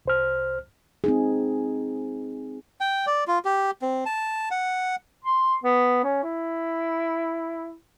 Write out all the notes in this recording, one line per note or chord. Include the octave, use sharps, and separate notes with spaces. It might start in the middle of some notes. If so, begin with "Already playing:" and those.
C2 C5 F6
C4 D#4 G#4
G5
D5
F4
G4
C4
A5
F#5
C6
B3
C#4
E4